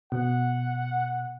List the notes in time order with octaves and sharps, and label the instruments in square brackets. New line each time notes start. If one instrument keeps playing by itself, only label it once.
[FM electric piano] B2 [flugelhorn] F#5